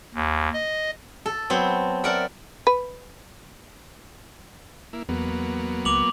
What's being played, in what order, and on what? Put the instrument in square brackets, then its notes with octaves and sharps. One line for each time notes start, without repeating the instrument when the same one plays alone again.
[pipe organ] D#2
D#5
[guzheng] A4
F#3 B3 C4
A#4 D5 E5 F#5
[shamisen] B4
[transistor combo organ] A#3 E4
[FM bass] E2 [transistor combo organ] F#3 A#3 B3
[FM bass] C#2 [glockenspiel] D6 F7 F#7